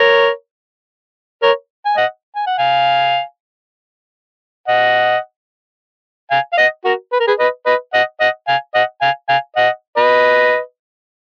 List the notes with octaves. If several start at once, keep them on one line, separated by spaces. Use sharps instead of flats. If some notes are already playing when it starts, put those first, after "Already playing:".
Already playing: A#4 C#5
A#4 C#5
G#5
D#5 F#5
G#5
F#5
F5 G#5
D#5 F#5
F5 G#5
F5
D#5 F#5
F#4 A#4
B4
A#4
G#4 B4
B4 D#5
B4 D#5
D#5 F#5
D#5 F#5
F5 G#5
D#5 F#5
F5 G#5
F5 G#5
D#5 F#5
B4 D#5